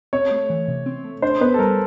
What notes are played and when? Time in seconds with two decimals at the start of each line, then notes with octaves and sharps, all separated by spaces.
0.13 C4 C#5
0.31 A3
0.50 E3
0.68 C3
0.86 C4
1.04 A3
1.22 D4 C5
1.41 B3 B4
1.54 A4
1.59 G3 A#4